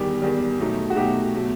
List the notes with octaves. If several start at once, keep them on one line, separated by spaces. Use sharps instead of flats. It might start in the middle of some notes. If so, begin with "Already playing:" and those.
Already playing: E2 D#3 G3 G4
E2 D#3 G3
B2 F#3 A3 D#4
F#4
B2 F#3 A3 D#4 G4
B2 F#3 A3